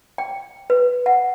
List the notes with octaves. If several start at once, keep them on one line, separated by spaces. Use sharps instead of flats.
G5
B4
F#5